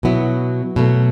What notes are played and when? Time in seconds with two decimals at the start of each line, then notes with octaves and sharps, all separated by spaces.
0.03 B2 F#3 B3 E4
0.76 B2 F#3 A3